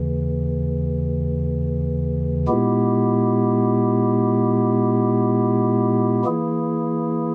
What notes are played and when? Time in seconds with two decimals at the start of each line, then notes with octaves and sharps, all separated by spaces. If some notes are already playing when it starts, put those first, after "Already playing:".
Already playing: D#2 C#3 E3
2.48 A#2 G#3 B3 E4 G4
6.25 E3 A#3 E4 G#4